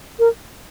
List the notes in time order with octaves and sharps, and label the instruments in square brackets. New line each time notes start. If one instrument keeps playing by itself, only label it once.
[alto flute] A#4